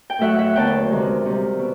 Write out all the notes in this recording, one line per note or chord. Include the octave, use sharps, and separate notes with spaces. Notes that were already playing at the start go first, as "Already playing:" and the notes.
G5
A2 F#3 A3 E5 F#5
E5 F#5
D#2 D3 F#3 B3 G5 A5
D2 C3 D#3 G#3
C3 D#3 G3
B2